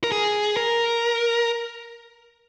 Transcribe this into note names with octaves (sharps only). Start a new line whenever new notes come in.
A#4
G#4
A#4